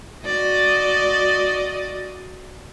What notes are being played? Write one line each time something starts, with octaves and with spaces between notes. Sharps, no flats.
F#4 D5 D#5